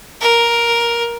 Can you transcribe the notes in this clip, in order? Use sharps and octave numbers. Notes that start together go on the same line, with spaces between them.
A#4